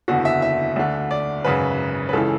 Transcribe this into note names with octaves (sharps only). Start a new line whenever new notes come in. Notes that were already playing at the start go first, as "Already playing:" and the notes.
F#1 E2 D3 F#4
E5
E5
D2 D3
D5
G#1 F#2 C#3 B4
B4
C#2 C#3 E3 A4